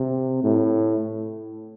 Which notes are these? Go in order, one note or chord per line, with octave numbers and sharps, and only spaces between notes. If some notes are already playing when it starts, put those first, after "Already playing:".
Already playing: C3
A2